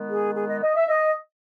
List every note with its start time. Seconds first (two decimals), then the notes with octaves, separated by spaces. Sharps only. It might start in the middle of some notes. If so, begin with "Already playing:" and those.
Already playing: D#3 G#3 B3
0.11 G#4
0.36 G#4
0.50 D#5
0.63 D#5
0.76 E5
0.89 D#5